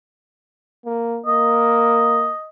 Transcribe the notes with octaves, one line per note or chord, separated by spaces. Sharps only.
A#3
A#3 D#5